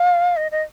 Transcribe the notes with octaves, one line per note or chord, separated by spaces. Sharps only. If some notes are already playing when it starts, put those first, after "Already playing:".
Already playing: F5
D#5
D#5